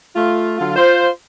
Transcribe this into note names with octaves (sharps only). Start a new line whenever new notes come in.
A3 F4
D3 F#3 F4
F4 C5